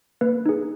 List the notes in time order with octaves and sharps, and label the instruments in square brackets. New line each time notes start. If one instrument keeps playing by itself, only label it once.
[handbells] A#3 B4
D#4 G#4